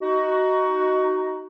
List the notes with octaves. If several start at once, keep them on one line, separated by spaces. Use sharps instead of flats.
D#4 F#4